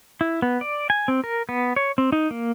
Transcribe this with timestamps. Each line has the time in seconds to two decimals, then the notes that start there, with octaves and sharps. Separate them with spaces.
0.21 E4
0.42 B3
0.61 D5
0.90 G#5
1.08 C4
1.24 A#4
1.49 B3
1.76 C#5
1.98 C4
2.12 D#4
2.31 A#3